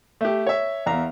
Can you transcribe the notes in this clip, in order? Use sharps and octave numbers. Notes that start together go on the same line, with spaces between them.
A3 G4
C#5 E5
E2 E5 F5 A#5